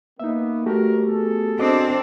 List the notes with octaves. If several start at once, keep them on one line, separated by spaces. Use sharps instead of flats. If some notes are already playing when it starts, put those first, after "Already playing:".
A#3 B3 D#4 E5
G1 D2 A3 F#4 G4 A#4
B3 G#4 A4
C4 D4 F#4 D#5 D6